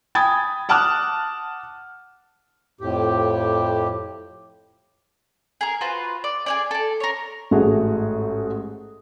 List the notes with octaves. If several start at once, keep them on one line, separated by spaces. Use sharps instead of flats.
G5 G#5 B5 D#6 G#6 A6
F#5 A5 D6 D#6 F6 F#6
F2 A2 G4
G#4 A#4
F4 F#4 B4 C5
D5
G#4 C#5 D5
A4 D5
A#4 C#5
A1 G#2 A3 F#4 G#4